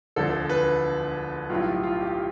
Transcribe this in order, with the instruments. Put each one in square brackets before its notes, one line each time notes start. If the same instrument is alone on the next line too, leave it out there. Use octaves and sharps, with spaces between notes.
[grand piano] E1 D2 D3 F3 A4
B4
B1 A2 G3 F4
F4
G4